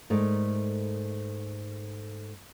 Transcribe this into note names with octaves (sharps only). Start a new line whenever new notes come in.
G#2 A3 A#4 D5